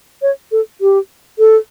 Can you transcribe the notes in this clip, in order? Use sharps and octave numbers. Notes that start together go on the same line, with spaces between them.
C#5
A4
G4
A4